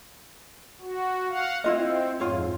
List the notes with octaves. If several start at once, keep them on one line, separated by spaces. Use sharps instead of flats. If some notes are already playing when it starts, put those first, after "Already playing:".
F#4
F5 F#5
C4 E4 F4 D#5
F2 G#2 F4 C#5